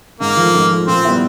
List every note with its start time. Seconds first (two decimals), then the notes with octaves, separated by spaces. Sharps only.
0.20 G#2 A#3
0.37 F3 A3
0.55 G#2
0.70 F3 A3
0.87 A#2 C4
1.05 G3 B3 E4